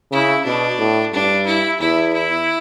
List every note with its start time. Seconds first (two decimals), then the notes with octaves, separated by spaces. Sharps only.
0.12 C#3 E4
0.45 B2 D4
0.78 A2
1.13 G2 D4
1.46 E4
1.80 E2 E4
2.13 E4